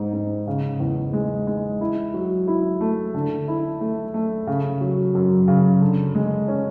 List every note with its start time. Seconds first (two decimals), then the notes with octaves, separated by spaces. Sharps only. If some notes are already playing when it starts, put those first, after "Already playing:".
Already playing: G#2
0.13 G#2
0.47 C#3
0.80 E2
1.13 G#3
1.47 G#3
1.81 E4
2.14 F#3
2.47 E4
2.81 A3
3.15 D3
3.48 E4
3.81 A3
4.14 A3
4.47 C#3
4.81 F#3
5.15 F#2
5.48 C#3
5.82 D3
6.15 G#3
6.48 C#4